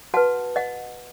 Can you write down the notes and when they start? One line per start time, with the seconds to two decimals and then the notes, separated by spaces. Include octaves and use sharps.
0.14 F#4 B4 F#5 A5
0.56 D#5 F#5